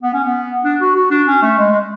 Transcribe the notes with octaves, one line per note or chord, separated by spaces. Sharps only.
B3
C#4
B3
D4
F#4
F#4
D4
C#4
A3
G#3
G#3